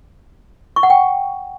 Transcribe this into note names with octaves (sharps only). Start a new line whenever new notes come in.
C#6
F#5
G5